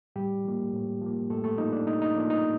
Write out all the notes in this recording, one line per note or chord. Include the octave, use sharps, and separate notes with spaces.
A2 G3 G4
F3 A#3
A2
F3 A#3
A2 A3 A4
A3 A4
F3 A#3 D#4
D4
A2 D#4
D#4
F3 A#3 D4
D#4